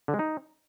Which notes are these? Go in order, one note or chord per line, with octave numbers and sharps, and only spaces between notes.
D3
G#3
D#4